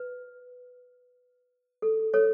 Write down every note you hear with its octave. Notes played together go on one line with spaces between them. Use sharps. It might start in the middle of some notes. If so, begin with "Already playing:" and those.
Already playing: B4
A4
A4 C#5